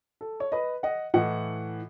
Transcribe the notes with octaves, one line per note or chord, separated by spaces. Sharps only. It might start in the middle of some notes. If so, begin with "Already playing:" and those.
A4
C#5
B4 D#5
D#5 F#5
A2 E3 D#5 F#5